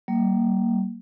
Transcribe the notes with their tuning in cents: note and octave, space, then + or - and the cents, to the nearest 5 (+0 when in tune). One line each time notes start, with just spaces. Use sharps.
G3 -35 A#3 +0